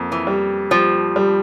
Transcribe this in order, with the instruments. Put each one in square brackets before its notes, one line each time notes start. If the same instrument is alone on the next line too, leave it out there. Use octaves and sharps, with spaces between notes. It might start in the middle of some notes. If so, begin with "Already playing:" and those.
Already playing: [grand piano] F2 A#3
[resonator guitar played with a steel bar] E3
[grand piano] G3
[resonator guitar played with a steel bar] F3 [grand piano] G3
[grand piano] G3